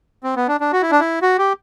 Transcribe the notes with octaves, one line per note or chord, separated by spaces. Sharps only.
C4
B3
D4
D4
F#4
E4
D4
E4
F#4
G4